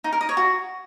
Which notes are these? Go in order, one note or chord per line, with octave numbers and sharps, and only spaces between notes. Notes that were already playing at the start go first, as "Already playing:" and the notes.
D#4
A#4
D#5
C#5
F#4